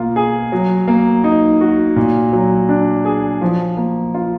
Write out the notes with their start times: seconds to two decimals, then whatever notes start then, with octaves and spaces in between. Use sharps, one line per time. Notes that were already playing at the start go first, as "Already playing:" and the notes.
Already playing: B2 A#3 F4
0.16 G#4
0.52 F#3
0.88 A#3
1.24 D#4
1.61 F#4
1.96 A#2
2.33 F#3
2.69 D4
3.05 G#4
3.41 F3
3.77 A#3
4.14 F4